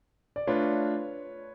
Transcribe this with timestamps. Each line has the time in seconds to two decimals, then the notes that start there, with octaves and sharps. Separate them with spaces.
0.36 D5
0.47 A3 D4 F4 B4 C#5